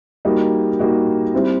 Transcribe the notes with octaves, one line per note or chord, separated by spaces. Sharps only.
G3 A#3 D#4 F#4
G3 A#3 D#4 F#4
G3 C4 E4